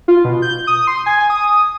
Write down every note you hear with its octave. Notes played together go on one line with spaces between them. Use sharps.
F4
B2
G6
D#6
C6
G#5
D#6